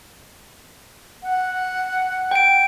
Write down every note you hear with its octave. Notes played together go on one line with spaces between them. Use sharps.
F#5
G5 D7